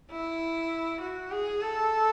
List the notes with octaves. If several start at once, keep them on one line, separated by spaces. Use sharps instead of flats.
E4
F#4
G#4
A4